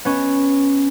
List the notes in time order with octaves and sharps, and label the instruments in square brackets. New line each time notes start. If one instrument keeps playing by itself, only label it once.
[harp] B3 C#4